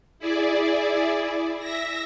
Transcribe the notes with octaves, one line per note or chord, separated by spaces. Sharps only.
E4 G#4 D5
E5 A#6